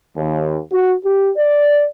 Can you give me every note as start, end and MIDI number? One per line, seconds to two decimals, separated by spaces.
0.17 0.59 39
0.72 0.94 66
1.04 1.32 67
1.37 1.87 74